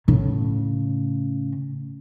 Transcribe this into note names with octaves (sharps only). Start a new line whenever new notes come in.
A2 C#3